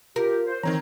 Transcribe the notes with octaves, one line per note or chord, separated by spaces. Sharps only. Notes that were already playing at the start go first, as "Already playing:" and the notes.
F4 G4 A#4
C5
D#3 E3 C4 C#5 A#5